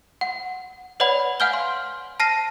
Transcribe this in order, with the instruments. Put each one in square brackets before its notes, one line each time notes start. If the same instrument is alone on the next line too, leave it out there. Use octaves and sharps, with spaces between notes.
[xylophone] F#5
B4 C#5 D5 F#5 B5
F5 F#5 G#5 F6 G6 G7
C6
A5 F6 A#6 C7 D#7